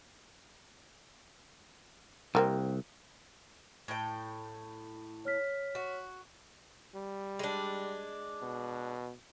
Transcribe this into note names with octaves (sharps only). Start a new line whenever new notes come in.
C2 G3 A#3 C4
A2 G5
C#5 F6 B6
F#4
G3
G#3 D4
B2